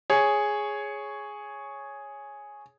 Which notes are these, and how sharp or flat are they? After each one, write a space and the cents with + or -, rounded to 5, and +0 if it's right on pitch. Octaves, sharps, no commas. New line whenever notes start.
G#4 +0 C#5 +0